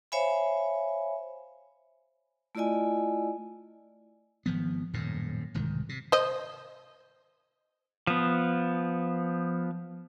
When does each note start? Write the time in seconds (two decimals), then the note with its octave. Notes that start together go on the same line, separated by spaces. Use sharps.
0.12 C5 C#5 E5 F5 G#5 B5
2.55 A3 E4 F4 D5 D#5 G#5
4.46 G#1 F3 B3
4.94 D#1 F#2 A2
5.54 E1 C2 G#2 D#3
5.89 C3
6.12 C5 D#5
8.07 F3 B3